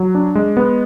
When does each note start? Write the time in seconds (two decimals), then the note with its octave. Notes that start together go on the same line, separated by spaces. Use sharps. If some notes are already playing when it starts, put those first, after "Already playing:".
Already playing: F#3
0.15 D4
0.35 G#3
0.57 B3